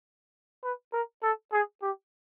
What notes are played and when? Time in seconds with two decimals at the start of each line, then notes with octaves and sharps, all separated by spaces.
0.64 B4
0.93 A#4
1.22 A4
1.52 G#4
1.82 G4